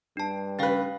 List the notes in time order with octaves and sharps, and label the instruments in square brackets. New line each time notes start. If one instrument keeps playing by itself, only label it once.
[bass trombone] G2 [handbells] D4 A5
[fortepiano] C#3 B4 [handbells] F5 G5 A6